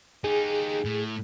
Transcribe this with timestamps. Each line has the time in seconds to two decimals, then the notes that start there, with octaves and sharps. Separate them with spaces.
0.24 D#4 G4 G#4
0.85 A2